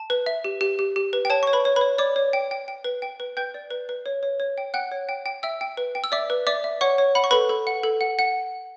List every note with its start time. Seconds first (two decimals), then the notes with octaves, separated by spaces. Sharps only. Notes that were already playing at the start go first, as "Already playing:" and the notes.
Already playing: A5
0.10 B4
0.26 E5
0.44 G4
0.61 G4
0.79 G4
0.96 G4
1.13 B4
1.25 G5
1.30 C#5 A5
1.43 C#5 C#6
1.53 B4 B5
1.65 C#5
1.76 B4 B5
1.81 C#5
1.98 C#5 D5 D6
2.16 C#5
2.33 G5
2.51 G5
2.68 G5
2.84 B4
3.02 G5
3.20 B4
3.37 B4 G5 G6
3.54 D5
3.70 B4
3.89 B4
4.06 C#5
4.23 C#5
4.40 C#5
4.58 G5
4.74 F#5 G5 F#6
4.92 C#5
5.09 G5
5.26 G5
5.43 E5 G5 E6
5.61 G5
5.77 B4
5.95 G5
6.04 E6
6.12 D5 E5 D6
6.30 B4
6.47 D5 E5 D6
6.64 E5
6.81 C#5 F#5 C#6
6.98 C#5
7.15 F#5 B5
7.24 C#6
7.31 A4 B4 B5
7.49 A4
7.67 F#5
7.83 A4
8.01 F#5
8.19 F#5